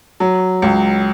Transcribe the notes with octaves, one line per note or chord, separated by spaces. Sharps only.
F#3
C#2